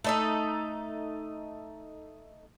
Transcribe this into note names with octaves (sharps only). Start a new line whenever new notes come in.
A3 D#4 A4